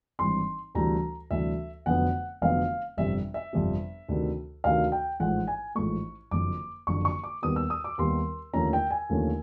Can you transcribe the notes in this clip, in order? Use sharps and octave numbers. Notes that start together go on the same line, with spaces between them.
G#1 G2 E3 G3 C4 C6
D2 C3 E3 G3 A#5
D2 C3 E3 G3 E5
F1 F2 D3 F#3 B3 F#5
F1 F2 D3 F#3 B3 F5
G1 F2 C3 E5
E5
G1 F2 C3
D2 C3 D#3
D2 C3 D#3 F5
G5
A1 G#2 F3 A3 F#5
G#5
A1 G#2 F3 A3 C#6
F#1 F2 D3 D6
F#1 F2 D3 C#6
C#6
D6
D#2 D#3 G3 B3 D#6
E6
D#6
D6
D#2 D#3 G3 B3 C6
D#2 D3 F3 A3 C#4 A#5
G5
G#5
D#2 D3 F3 A3 C#4